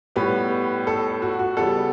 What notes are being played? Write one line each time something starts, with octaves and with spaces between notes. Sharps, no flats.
A2 G3 B3 B4
A4
F#4
F#4
C#3 G3 B3 A4